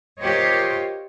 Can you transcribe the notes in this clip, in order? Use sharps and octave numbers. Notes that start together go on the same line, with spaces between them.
F4 G4 A#4 C5 C#5 D#5